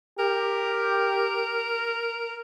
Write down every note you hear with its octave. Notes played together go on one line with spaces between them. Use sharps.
G4 A#4